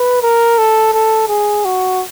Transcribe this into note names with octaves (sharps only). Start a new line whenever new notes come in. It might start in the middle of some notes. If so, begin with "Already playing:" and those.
Already playing: B4
A#4
A4
A4
G#4
F#4